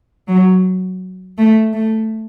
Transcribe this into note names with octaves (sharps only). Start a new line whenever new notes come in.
F#3
A3
A3